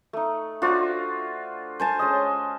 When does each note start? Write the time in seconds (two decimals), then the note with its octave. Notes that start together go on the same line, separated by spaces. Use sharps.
0.13 A3 D#4
0.62 D4 F4 F#4 C5
1.80 C5 G#5 A5
1.99 G#3 C#4 D#5